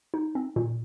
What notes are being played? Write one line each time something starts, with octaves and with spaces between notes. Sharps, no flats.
D#4
C4
A#2